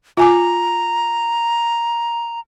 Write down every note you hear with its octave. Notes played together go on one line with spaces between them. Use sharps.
F4 G#5 A#5 D6